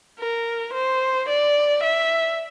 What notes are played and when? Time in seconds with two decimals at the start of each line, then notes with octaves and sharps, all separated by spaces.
0.19 A#4
0.74 C5
1.29 D5
1.83 E5